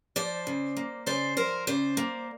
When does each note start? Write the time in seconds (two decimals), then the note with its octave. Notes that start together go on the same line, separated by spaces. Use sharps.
0.16 F3 C5 D5
0.47 C#3
0.77 A#3
1.06 C#3 C5 D5
1.37 F3 A#4 C5
1.67 C#3 C5 D5
1.97 A#3